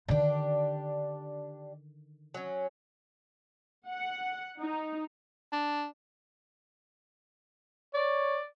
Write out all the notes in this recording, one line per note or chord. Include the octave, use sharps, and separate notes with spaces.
D3 D#3 D4 G4
F#3 C#4
F#5
D#4
D4
C#5 D5